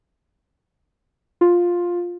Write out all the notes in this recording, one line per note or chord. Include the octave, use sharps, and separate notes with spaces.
F4